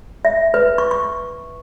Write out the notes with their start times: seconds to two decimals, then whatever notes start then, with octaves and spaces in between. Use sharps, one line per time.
0.25 E5
0.54 B4
0.78 C#6
0.91 C#6